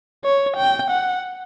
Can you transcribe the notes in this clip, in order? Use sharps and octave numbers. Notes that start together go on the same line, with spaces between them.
C#5
G5
F#5